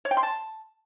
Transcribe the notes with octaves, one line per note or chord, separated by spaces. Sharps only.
C#5
G5
C6
A5